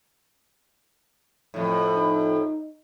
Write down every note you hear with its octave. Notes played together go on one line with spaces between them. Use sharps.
F2 A2
D#4